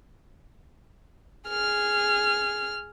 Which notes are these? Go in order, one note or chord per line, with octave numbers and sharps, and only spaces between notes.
G#4 F6